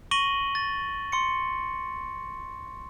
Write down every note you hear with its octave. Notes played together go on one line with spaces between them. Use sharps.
C#6 A#6 D#7 F#7 G7
A6
C6 C#7